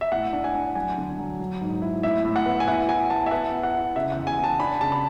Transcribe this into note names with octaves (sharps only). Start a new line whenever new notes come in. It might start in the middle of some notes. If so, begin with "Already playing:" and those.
E5
A2 F#5
D4
G#5
D4
F#3 G#5
D3
F#3
F#3
G#2
E4
A2 E5
A2
F#5
B3
G#5
E4 F#5
E4 G#5
E4 A5
E5
B3 F#5
E4
F#5
E4
C#3 E5
F#5
E2
G#5
E3
A5
D4 B5
C#3 A5
B5